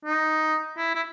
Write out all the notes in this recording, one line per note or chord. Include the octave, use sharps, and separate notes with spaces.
D#4
E4
E4